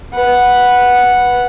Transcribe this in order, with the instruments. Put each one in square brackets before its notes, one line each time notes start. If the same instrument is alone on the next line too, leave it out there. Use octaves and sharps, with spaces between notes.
[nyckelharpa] B4 F#5